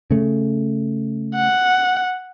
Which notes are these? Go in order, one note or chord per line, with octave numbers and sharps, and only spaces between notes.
C#3 A3
F#5